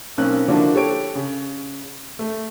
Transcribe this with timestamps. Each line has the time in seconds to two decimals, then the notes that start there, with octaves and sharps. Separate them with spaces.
0.17 B1 A#3 C4 C#4 F#6
0.48 D3 F3 A#3 D4 E4 F#4
0.74 G4 A4 C#5 D7
1.15 C#3
2.19 A3